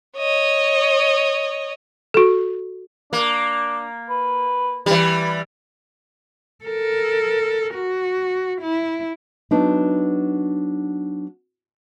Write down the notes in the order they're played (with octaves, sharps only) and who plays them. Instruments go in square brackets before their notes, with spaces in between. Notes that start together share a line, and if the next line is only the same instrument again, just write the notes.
[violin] C#5 D#5
[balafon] F#4 A4
[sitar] A#3 [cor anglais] D4
[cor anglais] B4
[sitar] E3 G3 [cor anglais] B4
[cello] A4 A#4
F#4
E4
[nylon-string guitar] F#3 B3 D4 D#4